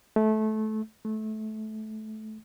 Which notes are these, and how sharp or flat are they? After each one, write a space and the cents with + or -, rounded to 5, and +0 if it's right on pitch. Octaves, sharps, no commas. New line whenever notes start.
A3 -20
A3 -20